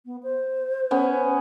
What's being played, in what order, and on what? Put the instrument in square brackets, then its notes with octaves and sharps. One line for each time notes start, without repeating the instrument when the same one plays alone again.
[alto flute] B3
C5
[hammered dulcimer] B3 C#4 G#5